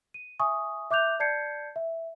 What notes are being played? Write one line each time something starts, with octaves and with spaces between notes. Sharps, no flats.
D#7
E5 G#5 C#6 D#6
E5 D6 F#6 G6 F7
D5 A5 G6 G#6 C7 C#7
E5